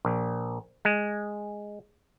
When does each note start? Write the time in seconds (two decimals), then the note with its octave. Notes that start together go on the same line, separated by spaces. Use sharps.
0.05 A#1
0.85 G#3